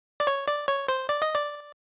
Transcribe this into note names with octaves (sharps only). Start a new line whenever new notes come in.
D5
C#5
D5
C#5
C5
D5
D#5
D5